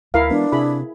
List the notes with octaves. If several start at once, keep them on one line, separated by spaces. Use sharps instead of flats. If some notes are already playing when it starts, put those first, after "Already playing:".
D2 E4 A#4 F5
E3 G#3 B3 D4
C3 E4 G#4 B5